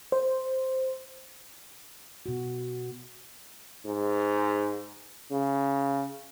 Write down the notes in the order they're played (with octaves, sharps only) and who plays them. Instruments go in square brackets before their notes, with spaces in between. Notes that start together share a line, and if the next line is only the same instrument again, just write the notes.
[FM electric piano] C5
[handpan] B2 F#4
[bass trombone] G#2
C#3